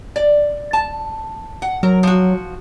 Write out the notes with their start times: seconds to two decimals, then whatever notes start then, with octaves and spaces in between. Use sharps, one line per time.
0.16 D5
0.73 A5
1.62 F#5
1.83 F#3 A#4
2.03 F3 F#4